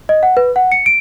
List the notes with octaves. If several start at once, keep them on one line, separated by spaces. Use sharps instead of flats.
D#5
F#5
B4
F#5
C#7
D7